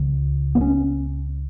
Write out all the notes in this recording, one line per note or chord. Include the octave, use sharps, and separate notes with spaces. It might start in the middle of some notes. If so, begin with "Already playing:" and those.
Already playing: C#2 C#3
B3
C#4